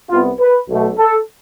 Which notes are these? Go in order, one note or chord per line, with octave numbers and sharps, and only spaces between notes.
C2 C3 G3 B3 F4
B4
B1 B2 A3
A4